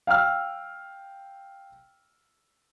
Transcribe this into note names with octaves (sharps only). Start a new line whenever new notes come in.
F5 G5 E6 F6